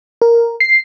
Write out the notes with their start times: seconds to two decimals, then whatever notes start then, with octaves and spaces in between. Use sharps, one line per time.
0.22 A#4
0.60 C7